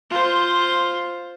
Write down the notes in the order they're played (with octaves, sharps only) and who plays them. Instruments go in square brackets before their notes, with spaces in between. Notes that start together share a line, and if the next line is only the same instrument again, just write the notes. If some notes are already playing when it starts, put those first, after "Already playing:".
[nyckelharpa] F4 C5